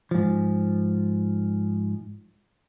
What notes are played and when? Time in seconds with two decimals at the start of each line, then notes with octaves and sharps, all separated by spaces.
0.11 G#2 F3